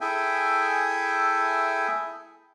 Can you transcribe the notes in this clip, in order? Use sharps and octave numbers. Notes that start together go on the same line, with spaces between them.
E4 G#4 A4 E5 G5 G#5